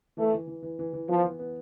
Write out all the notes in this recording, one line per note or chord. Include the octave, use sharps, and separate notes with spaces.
E3 A3
E3
E3
E3
E3
E3
F3 B3
E3
B3